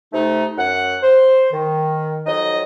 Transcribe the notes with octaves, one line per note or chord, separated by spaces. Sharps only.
C3 A3 D#4
F#2 F#5
C5
D#3
F2 F#3 D#4 D#5